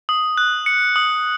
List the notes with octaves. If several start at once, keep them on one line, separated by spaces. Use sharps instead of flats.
D#6
F#6
C#7
D#6